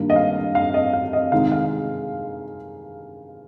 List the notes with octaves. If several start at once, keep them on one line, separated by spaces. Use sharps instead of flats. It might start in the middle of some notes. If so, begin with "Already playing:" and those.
Already playing: G2 D#3 G3 A#3 D4
D#5
F5
F5
D#5
F5
D#5
C3 D#3 G#3 D#4 F5
F5